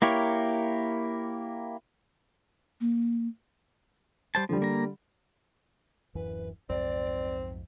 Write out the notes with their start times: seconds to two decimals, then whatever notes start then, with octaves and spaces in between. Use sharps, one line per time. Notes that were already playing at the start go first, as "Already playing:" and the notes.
0.02 A#3 E4 G4 A#4 C#5
2.81 A#3
4.35 G3 C5 A5
4.49 D3 F3 G3
4.62 A#3 A#5
6.15 D1 F#2 E3 B4
6.69 B1 F2 G#2 C4 D5